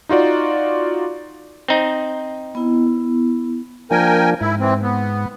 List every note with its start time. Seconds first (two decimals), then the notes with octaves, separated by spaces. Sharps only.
0.09 D#4 F4 F#4 D5
1.68 C4 D#4
2.55 B3 E4
3.91 F3 A#3 D4 A#4 G5 G#5
4.41 G#2 E4
4.60 E3 C4
4.83 B3